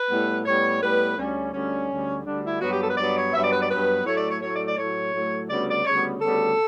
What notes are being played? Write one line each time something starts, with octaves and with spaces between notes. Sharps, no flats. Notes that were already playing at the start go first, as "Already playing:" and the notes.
Already playing: B4
A2 G3 B3
A2 G3 B3 C#5
A2 G3 B3 B4
D2 D3 G3 C#4
D2 D3 G3 C#4
D2 D3 G3
D2 D3 G3 D4
E4
G2 F#3 B3 F#4
G4
A4
B4
G2 F#3 B3 D5
C#5
G2 F#3 B3 E5
D5
B4
D5
G2 F#3 B3 B4
A2 F#3 A3 C#5
D5
C#5
A2 F#3 A3 C#5
D5
D5
A2 F#3 A3 C#5
A2 F#3 A3
D2 C#3 G3 B3 D5
D5
D2 C#3 G3 B3 C#5
D2 C#3 G3 B3 A4